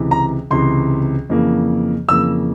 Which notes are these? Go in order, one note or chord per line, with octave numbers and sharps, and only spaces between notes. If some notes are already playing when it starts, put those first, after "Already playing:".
Already playing: C#2 C3 E3
A#5
C#2 C3 E3 C6
F2 C#3 E3 A#3
F2 C#3 E3 A#3 E6